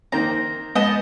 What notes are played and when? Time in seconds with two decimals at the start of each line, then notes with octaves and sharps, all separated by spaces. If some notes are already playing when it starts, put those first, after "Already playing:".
0.12 D#3 A#3 C4 A#5
0.75 G#3 B3 D#5 A5